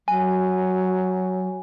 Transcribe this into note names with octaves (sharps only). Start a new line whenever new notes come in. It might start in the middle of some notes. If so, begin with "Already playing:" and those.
F#3 G#5